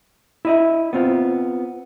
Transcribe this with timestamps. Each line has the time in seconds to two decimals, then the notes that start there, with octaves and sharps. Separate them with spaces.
0.45 E4 D#5 E5
0.93 B3 C4 F4